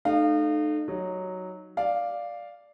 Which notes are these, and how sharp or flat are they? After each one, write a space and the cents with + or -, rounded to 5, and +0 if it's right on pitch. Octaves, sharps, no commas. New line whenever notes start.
A3 -10 D#4 -35 F5 +0
F#3 +0 D#4 +0
D5 +0 F5 +0